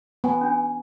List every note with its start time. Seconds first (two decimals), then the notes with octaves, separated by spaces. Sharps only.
0.24 B3 G#5
0.41 C#4 D4 G#5